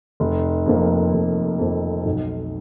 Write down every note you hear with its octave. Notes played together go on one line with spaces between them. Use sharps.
F1
F2 F3 A#3
F1
F2 F3 A#3
B1